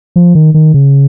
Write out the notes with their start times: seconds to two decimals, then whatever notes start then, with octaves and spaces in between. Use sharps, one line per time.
0.16 F3
0.35 D#3
0.54 D#3
0.74 C#3